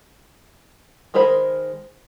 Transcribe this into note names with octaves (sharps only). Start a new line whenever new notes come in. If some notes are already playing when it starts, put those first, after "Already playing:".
D#3 G#3 A#4 C5 B5